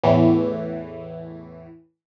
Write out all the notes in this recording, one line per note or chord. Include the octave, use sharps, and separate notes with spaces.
E2 A2 E3